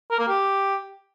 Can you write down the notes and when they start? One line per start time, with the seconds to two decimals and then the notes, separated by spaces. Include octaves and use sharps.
0.11 A#4
0.19 A#3
0.28 G4